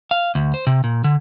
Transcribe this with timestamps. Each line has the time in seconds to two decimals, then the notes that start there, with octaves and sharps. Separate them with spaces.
0.11 F5
0.35 D2
0.54 C5
0.67 C3
0.84 A#2
1.04 D3